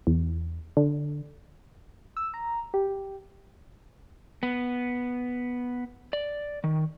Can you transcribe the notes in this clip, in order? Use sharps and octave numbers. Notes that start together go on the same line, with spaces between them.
E2
D3
E6
A#5
G4
B3
D5
D#3